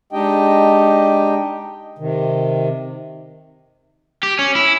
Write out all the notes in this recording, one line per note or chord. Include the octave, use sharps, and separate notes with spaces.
G#3 D4 D#4 G4 D#5 G5
C3 D#3
G4
C#4
E4